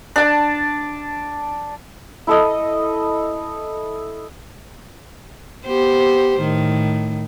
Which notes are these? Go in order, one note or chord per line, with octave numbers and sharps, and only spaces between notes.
D4 A5
E4 A4 D#5
B3 G4 C5
A2 D#3